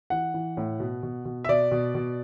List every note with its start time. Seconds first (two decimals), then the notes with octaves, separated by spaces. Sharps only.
0.10 E3 F#5
0.34 E3
0.57 A2
0.80 B2
1.03 B2
1.25 B2
1.44 E5
1.49 B2 D5
1.71 B2
1.95 B2